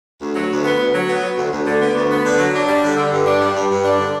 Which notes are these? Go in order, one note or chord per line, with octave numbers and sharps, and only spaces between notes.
D2
F#3
D2
B3
D2
F#3
B3
F#3
D2
D2
D3
B3
D2
B3
D3
F#3
D4
G3
D3
D3
G2
D4
G3
G2
G2
D4
D3